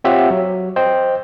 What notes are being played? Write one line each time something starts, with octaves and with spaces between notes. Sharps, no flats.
C4 F4 G4 C#5 E5 F#5
F#3
C5 D#5 G5